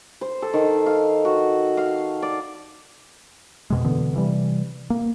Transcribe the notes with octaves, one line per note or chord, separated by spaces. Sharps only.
C5
A4
D#3
F5
F#4
F5
D5
F2 B2 G#3
B2 D3 E3 B3
C3 E3 G3
A#3